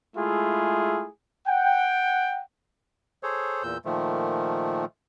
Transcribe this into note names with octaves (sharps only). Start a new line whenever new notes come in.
G#3 A3 E4 F4 G#4
F#5 G5
G#4 A4 C5 C#5
E2 A#2 E6 G6
A#2 D#3 F3 A3